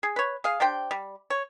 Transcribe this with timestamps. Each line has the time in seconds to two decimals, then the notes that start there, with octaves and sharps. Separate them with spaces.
0.03 G#4
0.16 B4 C#5
0.44 G#4 F5
0.60 D4 G4 C5 G5
0.91 G3
1.30 C#5